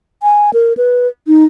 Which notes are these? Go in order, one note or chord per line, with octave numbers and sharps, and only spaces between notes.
G#5
A#4
B4
D#4